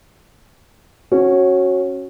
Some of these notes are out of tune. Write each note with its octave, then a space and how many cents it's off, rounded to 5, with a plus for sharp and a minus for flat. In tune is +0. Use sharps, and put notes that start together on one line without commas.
C#4 -20 F#4 +0